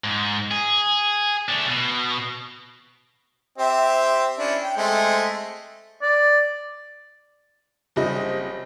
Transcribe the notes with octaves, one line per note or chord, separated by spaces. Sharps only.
G#2
G#4
A3 D4
B2
C4 G4 E5
C#4 D4 E4
G5
G#3 A3 C4
D5
F#1 C3 G3 D#5